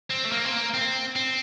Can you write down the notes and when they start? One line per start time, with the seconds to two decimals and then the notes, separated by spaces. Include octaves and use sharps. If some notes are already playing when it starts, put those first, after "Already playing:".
0.11 C4
0.25 A3
0.32 A#3
0.45 C4
0.52 A#3
0.74 C4
1.16 C4